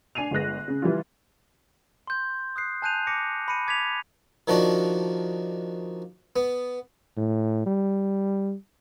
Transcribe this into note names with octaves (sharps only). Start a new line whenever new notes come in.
D4 G#5 C7 D#7 F7
G1 G#3 B4 F#6 A#6
C#3
E3 G3 F4
C6 G6
D#6 F#6 C7
G#5 A5 F#6 G6 D#7 F7
D6 A#6 C#7
B5 A#6 C#7 D#7
B5 D6 G#6 B6 D#7 F7
D#3 F3 D4 F#4
B3
A2
G3